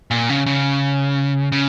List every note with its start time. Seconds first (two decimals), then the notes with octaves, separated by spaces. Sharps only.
0.11 A#2
0.30 C#3
0.46 C#3
1.52 C#3